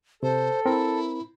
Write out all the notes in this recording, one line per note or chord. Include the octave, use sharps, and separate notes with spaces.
C3 A4 C5
C4 E4 A#4